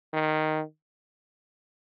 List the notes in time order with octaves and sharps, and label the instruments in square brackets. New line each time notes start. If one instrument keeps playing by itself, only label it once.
[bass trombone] D#3